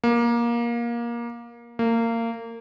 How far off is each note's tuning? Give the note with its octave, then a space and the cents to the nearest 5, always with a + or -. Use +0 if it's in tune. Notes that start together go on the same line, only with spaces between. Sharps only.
A#3 +20
A#3 -25